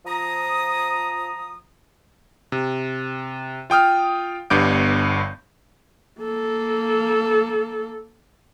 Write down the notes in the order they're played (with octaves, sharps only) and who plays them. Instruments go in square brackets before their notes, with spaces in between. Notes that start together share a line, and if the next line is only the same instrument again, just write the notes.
[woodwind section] F3 A#5 D#6
[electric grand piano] C3
F4 G5 D#6 F6
G1 G2 B3 D6 G6 D7
[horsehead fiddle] A#3 A4